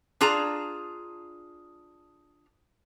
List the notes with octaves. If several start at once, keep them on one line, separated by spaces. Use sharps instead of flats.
D4 F4 G#4 A5 A#5